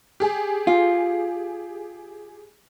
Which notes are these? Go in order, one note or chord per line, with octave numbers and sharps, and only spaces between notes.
G4 G#4
F4